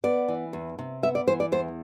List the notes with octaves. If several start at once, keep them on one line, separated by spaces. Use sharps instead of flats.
B3 D5
E3
E2
C3
B3 E5
D5
E3 C5
D5
E2 C5